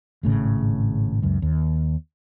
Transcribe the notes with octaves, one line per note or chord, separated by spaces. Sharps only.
G#1 A2 C#3
C#2 F#2
D#2